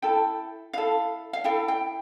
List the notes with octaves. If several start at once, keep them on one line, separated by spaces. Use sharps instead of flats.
E4 A4 G5
E4 A4 F5
F5
E4 A4 G5
G5